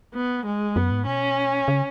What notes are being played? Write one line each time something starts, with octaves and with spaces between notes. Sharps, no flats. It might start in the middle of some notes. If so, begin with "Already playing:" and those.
B3
G#3
F#2 B3
G#2
B2 C#4
C#3